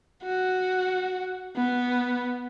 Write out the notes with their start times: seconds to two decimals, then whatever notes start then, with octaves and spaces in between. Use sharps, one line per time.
0.24 F#4
1.56 B3